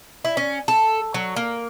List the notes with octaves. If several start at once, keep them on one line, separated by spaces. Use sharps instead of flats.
E4
C#4
A4
F#3
A#3